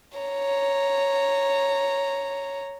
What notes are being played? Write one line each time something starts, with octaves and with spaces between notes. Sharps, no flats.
C#5 A#5